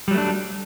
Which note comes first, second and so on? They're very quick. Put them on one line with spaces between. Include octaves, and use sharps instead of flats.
G3 F#3 A3 D4